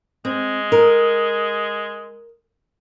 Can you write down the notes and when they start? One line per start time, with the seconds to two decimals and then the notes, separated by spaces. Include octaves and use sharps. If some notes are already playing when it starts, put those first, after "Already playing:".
0.25 G#3 C4
0.72 A#4